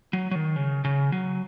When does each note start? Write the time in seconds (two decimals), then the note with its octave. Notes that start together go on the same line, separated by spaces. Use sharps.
0.13 F#3
0.31 F#3
0.35 D#3
0.56 C#3
0.85 C#3
1.12 F#3